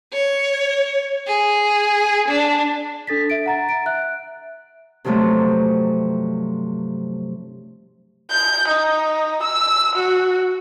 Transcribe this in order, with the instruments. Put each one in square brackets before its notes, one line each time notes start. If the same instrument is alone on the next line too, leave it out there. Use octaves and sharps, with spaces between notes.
[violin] C#5
G#4
D4
[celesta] D4 A4 A6 B6
E5 D7
F#5 A#5 A6
D7
E5 F#6
[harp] G2 C3 F3 F#3 A3
[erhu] G6
D#4
E6
F#4